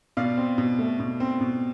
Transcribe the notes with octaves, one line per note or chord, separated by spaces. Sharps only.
B2 D5 F5
C4
B2
A3
B2
C4
B2